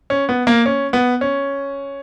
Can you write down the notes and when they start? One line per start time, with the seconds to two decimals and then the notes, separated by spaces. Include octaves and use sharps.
0.10 C#4
0.29 B3
0.47 A#3
0.66 C#4
0.93 B3
1.21 C#4